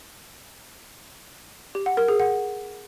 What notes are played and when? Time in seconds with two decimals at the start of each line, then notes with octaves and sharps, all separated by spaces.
1.75 G4
1.86 F#5
1.97 A#4
2.08 G#4
2.20 F#5